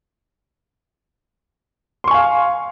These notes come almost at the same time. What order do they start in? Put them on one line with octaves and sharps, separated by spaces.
C6 C#6 G#5 F5